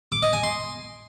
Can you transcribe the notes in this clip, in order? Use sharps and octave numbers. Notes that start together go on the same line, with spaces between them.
D6
D#5
G#5
C6